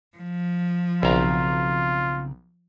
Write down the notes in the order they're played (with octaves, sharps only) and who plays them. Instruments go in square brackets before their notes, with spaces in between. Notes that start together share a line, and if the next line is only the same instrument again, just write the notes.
[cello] F3
[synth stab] B1 [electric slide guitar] C#3 C4 A#5 [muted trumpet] F4